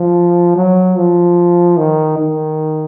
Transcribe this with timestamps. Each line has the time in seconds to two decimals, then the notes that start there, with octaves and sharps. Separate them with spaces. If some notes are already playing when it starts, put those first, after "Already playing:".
Already playing: F3
0.56 F#3
0.96 F3
1.77 D#3
2.18 D#3